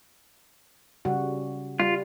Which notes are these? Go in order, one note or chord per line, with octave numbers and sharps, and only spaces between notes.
C#3 G3 F#4
G3 F4